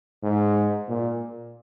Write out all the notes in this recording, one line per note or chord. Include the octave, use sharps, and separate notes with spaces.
G#2
A#2